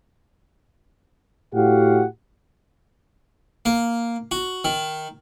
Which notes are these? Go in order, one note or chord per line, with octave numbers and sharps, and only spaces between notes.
A2 F#4 G4 F5 F#5
A#3
F#4
D#3